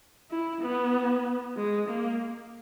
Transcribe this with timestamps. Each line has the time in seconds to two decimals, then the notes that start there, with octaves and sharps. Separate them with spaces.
0.31 E4
0.62 B3
1.56 G#3
1.88 A#3